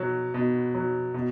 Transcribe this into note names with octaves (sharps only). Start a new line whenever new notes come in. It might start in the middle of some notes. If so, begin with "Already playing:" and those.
Already playing: B2 F#3
B2
F#3
B2